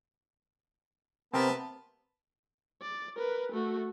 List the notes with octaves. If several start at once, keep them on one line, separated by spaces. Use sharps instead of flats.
C3 B3 C4 A#4 A5
D5
A#4 B4
A3 F#4